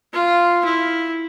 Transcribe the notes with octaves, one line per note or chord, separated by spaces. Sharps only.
F4
E4